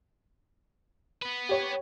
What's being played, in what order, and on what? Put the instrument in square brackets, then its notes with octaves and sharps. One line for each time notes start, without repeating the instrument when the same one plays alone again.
[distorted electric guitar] B3 B4
[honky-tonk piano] G4 C#5